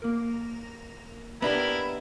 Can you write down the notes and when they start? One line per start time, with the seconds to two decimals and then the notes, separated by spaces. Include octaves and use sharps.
0.02 A#3 A#4
1.42 B3 D4 E4 G4 A#4 D#5 B5